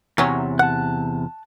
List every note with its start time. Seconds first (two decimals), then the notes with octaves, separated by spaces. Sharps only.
0.18 E2 C3 F#3 C#4
0.59 F#5 A5 F#6